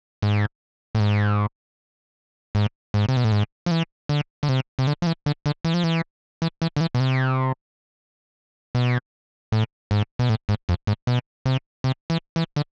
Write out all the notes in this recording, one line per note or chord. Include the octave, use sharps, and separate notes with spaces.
G#2
A2
G#2
G#2
G#2
C3
B2
A2
G#2
F3
E3
D3
D3
C3
C3
D3
F3
E3
D3
D3
E3
F3
E3
E3
E3
D3
E3
B2
C3
B2
A2
G#2
B2
A2
G#2
F2
G#2
B2
C3
C3
E3
E3
D3